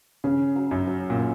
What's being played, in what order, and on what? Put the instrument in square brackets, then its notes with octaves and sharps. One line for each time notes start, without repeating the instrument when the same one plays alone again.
[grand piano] C#3 [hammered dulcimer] C#4
[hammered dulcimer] F#3
[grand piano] F#2
[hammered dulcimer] F#3
[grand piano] A#2
[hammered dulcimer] C#4